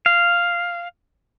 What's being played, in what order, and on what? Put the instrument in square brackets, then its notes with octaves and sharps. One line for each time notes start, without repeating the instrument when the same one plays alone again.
[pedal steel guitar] F5